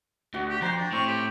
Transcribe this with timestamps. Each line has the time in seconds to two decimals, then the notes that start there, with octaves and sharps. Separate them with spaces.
0.34 D2 F#4 F#5
0.49 G4
0.62 F2 C5 G5 A#5
0.77 D4
0.93 A2 C4 C#6
1.07 G4